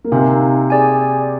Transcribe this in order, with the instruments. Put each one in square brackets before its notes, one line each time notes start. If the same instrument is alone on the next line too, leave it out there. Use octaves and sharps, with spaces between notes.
[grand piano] A#3
[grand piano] C3 C4 [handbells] D#4 A#4 F5 G#5
[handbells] G#4 D5 G#5